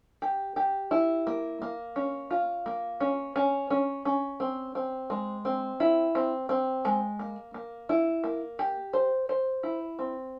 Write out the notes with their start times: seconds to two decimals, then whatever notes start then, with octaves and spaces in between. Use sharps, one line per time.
0.22 G4
0.56 G4
0.91 E4
1.27 A#3
1.62 A#3
1.96 C#4
2.31 F4
2.66 A#3
3.00 C#4
3.36 C#4
3.70 C#4
4.05 C#4
4.40 C4
4.75 C4
5.10 G#3
5.45 C4
5.80 E4
6.15 C4
6.49 C4
6.85 G#3
7.19 A#3
7.54 A#3
7.89 E4
8.24 A#3
8.59 G4
8.93 C5
9.29 C5
9.63 E4
9.99 C4